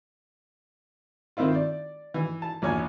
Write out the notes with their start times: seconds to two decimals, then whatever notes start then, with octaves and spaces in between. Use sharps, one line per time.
1.37 D#3 C4 E4 F4
1.55 D5
2.14 E3
2.42 A5
2.62 A#1 E2 C#5 G#5